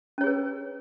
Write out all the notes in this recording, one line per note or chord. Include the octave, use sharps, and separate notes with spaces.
C#4 G#4 B4 C#5